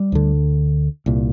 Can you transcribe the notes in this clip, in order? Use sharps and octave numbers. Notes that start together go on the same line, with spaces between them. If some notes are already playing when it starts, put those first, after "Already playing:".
Already playing: G3
D2 D3
C2 A#2